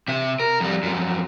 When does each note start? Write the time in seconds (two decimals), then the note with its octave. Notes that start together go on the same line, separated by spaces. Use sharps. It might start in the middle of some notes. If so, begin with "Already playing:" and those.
0.08 C3 E5
0.40 A#4
0.60 F2 G3
0.83 F#2 F3